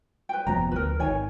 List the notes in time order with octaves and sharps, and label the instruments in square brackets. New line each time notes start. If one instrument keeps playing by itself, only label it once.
[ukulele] B4 G5
[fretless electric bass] F1 F3 B3 [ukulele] A#5
[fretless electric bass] D2 [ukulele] A#4 B4
[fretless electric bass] G#1 D#3 [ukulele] C#5 G#5